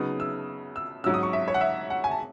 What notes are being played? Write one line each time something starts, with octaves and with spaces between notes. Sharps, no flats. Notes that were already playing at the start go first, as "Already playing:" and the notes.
Already playing: C#3 F#3 B3 D#4 D#6
E6
E6
G#2 F#3 C#4 E6
D#6
C#6
E5
C#5
F#5
E5
F#5
G#5
A5